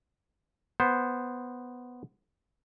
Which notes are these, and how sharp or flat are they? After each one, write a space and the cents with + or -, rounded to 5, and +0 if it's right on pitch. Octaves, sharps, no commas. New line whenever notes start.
B3 +0 C5 +0